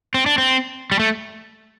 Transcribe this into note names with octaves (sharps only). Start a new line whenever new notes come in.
C4
D4
C4
G3
A3